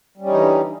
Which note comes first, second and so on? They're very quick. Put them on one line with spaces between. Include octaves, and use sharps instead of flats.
G3 C#4 D#4 E3 D3